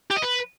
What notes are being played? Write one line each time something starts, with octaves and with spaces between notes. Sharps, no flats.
G4
D#5
B4